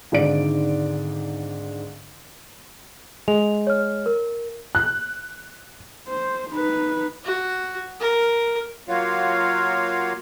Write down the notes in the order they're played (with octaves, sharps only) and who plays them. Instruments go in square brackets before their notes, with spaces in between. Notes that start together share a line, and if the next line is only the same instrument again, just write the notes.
[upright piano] G#1 G#2 D3 D5 D7
[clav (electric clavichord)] G#3 [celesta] F7
[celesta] C#5 F6
A#4
[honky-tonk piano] F#6
[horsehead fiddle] C5
D#4 B4
[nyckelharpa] F#4
A#4
[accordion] F#3 A#3 F4 F#4 C#5 F5